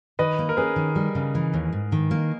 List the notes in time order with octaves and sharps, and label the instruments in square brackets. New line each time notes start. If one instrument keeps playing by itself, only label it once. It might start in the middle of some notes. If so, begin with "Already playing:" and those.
[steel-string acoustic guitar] D#3 [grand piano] B4 D#5
[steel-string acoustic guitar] A#3
[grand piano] A#4
[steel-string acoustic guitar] C#4 [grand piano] G#4 B4
[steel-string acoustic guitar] D#3
G3
C#3
E3
D#2
G#2
D#3
A#3